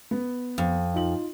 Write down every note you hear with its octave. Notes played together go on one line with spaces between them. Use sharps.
B3
F2
D#4 F4 F#7